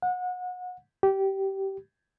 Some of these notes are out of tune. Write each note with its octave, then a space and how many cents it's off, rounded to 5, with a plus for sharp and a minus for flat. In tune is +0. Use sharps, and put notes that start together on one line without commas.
F#5 -30
G4 -20